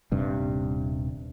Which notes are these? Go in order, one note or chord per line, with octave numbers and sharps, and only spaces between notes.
D#1 G2 C3